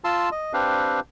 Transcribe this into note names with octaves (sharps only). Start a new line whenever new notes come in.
F4 A5 C6 E6
D#5
C4 D4 G4 B4 F5